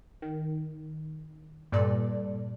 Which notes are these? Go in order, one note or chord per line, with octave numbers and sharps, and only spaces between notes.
D#3
G2 A#2 G3 A4 D5